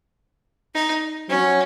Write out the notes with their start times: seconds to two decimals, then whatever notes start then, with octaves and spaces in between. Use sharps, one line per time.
0.74 D#4
1.29 F#3 C#4